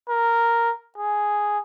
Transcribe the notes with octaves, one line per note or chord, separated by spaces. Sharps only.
A#4
G#4